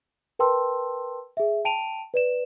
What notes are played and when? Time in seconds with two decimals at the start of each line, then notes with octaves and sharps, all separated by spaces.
0.39 A#4 B4 G5 A5 C6 E6
1.37 G#4 E5
1.65 G5 A5 D7 D#7 F7
2.14 B4 D5 E7